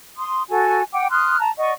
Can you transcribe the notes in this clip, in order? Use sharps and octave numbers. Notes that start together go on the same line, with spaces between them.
C6 D#6
F#4 A4 G#5
F#5 G5 D6
C6 D#6 F6 F#6
A5 A#5
D5 D#5 F#5 C#6